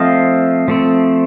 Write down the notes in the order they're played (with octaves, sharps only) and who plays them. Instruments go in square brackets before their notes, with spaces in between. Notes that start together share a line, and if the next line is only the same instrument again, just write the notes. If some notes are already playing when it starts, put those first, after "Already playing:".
Already playing: [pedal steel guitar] F3 A3 C4 D#5 F5
F3 A3 C4